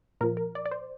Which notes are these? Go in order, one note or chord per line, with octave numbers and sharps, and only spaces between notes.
A#2 F3 A#4
A#4
D5
D5
C5